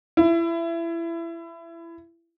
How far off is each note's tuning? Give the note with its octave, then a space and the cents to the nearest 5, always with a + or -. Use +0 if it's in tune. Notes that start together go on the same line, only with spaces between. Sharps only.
E4 +25